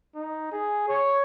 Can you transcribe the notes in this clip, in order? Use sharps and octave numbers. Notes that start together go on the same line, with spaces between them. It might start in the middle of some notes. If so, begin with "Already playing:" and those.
D#4
G#4
C#5